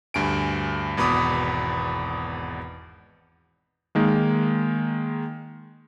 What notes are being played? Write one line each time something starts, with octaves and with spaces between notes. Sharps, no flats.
D2 G2 G#5 D7
G#1 E2 B2 B5 D6 D#6
D#3 G#3 A#3